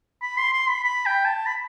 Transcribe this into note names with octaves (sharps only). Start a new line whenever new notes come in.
B5
C6
C6
B5
B5
G5
A5
B5